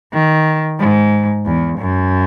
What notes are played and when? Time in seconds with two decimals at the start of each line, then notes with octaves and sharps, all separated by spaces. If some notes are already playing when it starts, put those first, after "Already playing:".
0.13 D#3
0.79 G#2
1.46 E2
1.78 F#2